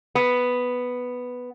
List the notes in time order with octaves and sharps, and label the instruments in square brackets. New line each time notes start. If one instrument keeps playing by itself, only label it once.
[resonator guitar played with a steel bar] B3